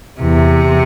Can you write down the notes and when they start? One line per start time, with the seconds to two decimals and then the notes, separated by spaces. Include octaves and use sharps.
0.21 E2 C3